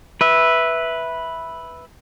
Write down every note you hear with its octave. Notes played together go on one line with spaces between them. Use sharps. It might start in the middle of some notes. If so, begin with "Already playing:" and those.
B4 E5